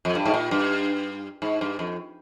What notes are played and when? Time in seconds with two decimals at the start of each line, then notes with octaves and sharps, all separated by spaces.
0.05 F2
0.15 G2
0.25 G#2
0.34 A#2
0.51 G2
1.42 G#2
1.61 G2
1.79 F2